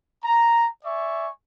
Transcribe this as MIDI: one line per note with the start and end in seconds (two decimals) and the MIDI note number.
0.24 0.67 82
0.84 1.28 74
0.84 1.28 76
0.84 1.28 80
0.84 1.28 85